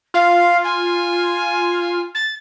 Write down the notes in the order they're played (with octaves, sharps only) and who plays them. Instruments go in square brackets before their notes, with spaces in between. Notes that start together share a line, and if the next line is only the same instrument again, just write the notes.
[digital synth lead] F4 [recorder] F5
[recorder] G#5
A6